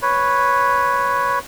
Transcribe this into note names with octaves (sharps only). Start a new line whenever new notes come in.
B4 C#5